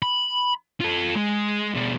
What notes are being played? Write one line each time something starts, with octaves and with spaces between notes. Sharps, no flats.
B5
F4 A4
G#3
B2 D4